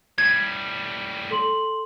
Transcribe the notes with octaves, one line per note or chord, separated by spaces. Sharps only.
A2 G3 G#6
A4 C6 F#7